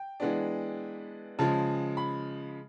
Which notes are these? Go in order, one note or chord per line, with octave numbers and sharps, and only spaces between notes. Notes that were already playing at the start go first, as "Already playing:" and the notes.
Already playing: G5
E3 G#3 B3 D4
C#3 F3 G#3 A5
B5